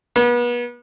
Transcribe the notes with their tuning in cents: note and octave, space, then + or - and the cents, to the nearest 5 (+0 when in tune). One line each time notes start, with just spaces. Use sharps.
B3 -35